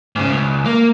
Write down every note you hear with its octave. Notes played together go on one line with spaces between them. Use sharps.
G#2 C#3
C#2
A#3